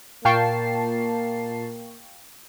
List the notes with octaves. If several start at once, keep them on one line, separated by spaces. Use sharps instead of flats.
A#2 A#3 F5 G5 A5 C#6 C7